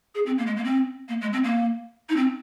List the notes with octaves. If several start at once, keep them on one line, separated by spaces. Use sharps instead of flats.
G#4
C4
A#3
G#3
A#3
C4
A#3
G#3
C4
A#3
D#4
C4